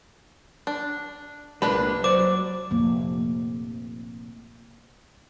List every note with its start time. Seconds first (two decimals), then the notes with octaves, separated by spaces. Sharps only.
0.67 D4
1.62 C2 G2 A#2 G#3 A#3 D4 B4
2.04 F#3 C5 D5 D6
2.71 F1 A#2